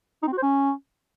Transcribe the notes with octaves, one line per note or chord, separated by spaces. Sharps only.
D#4
C4
F#4
C5
C#4